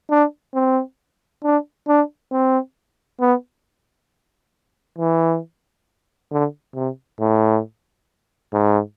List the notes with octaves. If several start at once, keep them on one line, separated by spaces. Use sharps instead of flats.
D4
C4
D4
D4
C4
B3
E3
D3
C3
A2
G#2